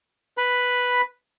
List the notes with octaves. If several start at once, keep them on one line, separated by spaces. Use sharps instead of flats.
B4 B5